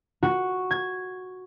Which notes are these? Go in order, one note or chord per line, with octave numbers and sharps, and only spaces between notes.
F#4
G#6